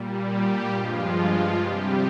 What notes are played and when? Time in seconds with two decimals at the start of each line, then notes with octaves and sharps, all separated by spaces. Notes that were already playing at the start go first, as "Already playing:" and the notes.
Already playing: A#2 G3
0.24 G4
0.69 G2 F3 G#3 F4
1.13 F4
1.57 C3 G3 G4